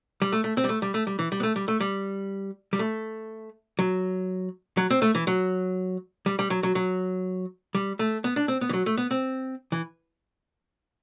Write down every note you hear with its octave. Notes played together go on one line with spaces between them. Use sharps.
G3
A3
A3
C4
G3
A3
G3
A3
G3
E3
G3
B3
A3
G3
A3
G3
G3
A3
F#3
F#3
C4
A3
E3
F#3
G3
G3
F#3
F#3
F#3
G3
A3
B3
D4
C4
B3
E3
F#3
A3
B3
C4
E3